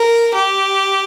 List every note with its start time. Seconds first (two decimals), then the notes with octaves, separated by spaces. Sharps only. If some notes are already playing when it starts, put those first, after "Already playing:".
Already playing: A#4
0.34 G4